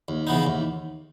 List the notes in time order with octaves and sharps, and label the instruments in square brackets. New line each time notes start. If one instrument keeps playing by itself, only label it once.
[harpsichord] D#2
C#3 E3 B3 D#4
D#2